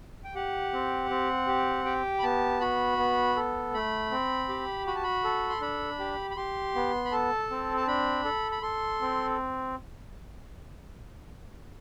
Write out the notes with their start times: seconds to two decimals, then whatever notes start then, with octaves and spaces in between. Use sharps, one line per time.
0.25 G5
0.35 G4 F#5
0.73 C4
1.10 C4
1.47 G4
1.85 G4 G5
2.19 B5
2.23 B3 A5
2.61 F#4 B5
2.98 B3
3.37 A4
3.73 A3 B5
4.11 C4
4.49 G4
4.87 F#4 B5
4.95 A5
5.04 B5
5.24 A4
5.50 C6
5.61 D4 B5
5.99 G4
6.30 B5
6.36 G4 C6
6.75 B3
7.05 B5
7.12 A4 A5
7.50 C4
7.77 A5
7.88 D4 B5
8.25 A4
8.52 B5
8.62 A4 C6
9.01 C4